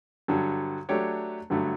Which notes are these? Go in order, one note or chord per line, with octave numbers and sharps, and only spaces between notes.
G2 D3 F#3
F#3 A3 D4 G4 C#5
G2 D3 F#3 A3